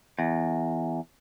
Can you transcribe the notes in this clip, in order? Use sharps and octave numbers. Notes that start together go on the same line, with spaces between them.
E2